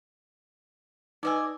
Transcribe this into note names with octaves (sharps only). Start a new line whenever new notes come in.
D#4 B4 D5 D#5 G#5 E6